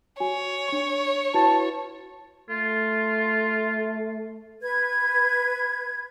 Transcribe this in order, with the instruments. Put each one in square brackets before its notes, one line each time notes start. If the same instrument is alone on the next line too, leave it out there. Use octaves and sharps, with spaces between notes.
[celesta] F#4 G#5 [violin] C#5
[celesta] D4 C#6
[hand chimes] E4 F#4 B4 [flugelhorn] A5
[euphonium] A3 [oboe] F4
[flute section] B4 G#6